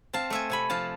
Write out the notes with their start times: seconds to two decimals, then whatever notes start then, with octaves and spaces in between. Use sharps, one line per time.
0.13 C4 F5 A5
0.30 A3 E5 G#5
0.50 C3 G#5 B5
0.70 F3 F5 A5